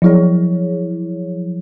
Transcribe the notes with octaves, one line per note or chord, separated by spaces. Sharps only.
F3 F#3 E4 G#4 C#5